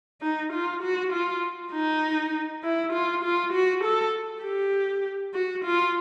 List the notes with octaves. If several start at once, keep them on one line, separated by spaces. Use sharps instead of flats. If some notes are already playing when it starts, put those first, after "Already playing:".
D#4
F4
F#4
F4
D#4
E4
F4
F4
F#4
A4
G4
F#4
F4